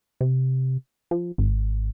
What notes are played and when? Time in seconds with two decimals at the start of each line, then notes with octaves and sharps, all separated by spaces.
0.21 C3
1.11 F3
1.38 G#1